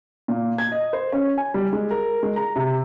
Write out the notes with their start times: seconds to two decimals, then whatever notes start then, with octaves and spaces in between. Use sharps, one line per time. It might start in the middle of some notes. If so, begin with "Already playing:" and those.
0.28 A#2
0.58 G#6
0.72 D#5
0.93 C5
1.12 C#4
1.38 G#5
1.54 G3
1.73 G#3
1.91 A#4
2.23 G#3
2.36 A#5
2.56 C3